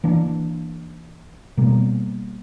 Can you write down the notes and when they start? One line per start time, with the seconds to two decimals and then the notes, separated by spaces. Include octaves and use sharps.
0.04 E3 A#3 D4
1.57 B2 G3 A#3